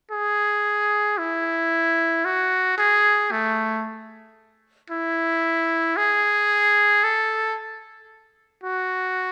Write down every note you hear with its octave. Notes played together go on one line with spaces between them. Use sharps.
G#4
E4
F#4
G#4
A3
E4
G#4
A4
F#4